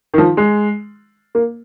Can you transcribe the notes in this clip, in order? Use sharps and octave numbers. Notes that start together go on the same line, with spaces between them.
D#3
F3
G#3
A#3